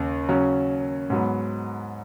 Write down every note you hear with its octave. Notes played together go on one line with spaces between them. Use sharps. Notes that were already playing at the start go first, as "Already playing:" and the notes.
Already playing: D#2 C#3
C#3 F#3 C#4
G#2 F#3 B3